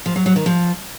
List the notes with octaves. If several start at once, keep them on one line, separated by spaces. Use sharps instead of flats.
F3
F#3
F#3
D#3
F3